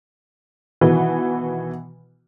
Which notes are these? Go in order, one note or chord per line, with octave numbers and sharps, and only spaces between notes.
B2 D#3 E3 F#4 B4